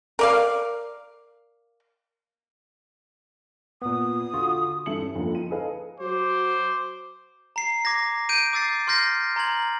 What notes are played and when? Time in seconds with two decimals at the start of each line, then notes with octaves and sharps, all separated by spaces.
0.19 A#4 D5 F5
3.82 A#2 B3 D#6
4.33 D3 F4 F#4
4.86 G2 E3 A4 E5 C#7 F#7
5.03 C#4
5.15 F2 D3 F3 A#3
5.35 D#4 D#7
5.51 G#4 A4 B4 D#5 F5
6.00 F#3 F#4 C5 D6
7.56 A#5 C7
7.84 D6 G#6 A#6 B6
8.29 G6 D7 D#7
8.53 D6 E6 A6 C7
8.88 C6 F6 G6 A#6 C7
9.36 A#5 C6 G#6 F#7